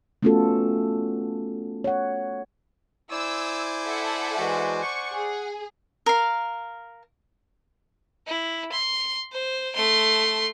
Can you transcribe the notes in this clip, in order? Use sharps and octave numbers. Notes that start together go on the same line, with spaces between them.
A3 B3 C#4 F4 F#4 A4
C#5 F#5
E4 C5 D5 G#5 E6
A4 E5 F#5
E3 G#3 F#4
F#5 C#6
G#4
A#4 F5
E4
C6
C5
A3 C6